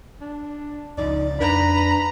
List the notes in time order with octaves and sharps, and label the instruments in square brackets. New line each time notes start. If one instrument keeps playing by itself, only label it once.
[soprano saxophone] D4
[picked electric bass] C#2 C#3 F3 [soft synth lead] D#4 [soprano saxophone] D5
[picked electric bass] F2 [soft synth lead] D4 [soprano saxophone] B4 [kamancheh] A#5 B5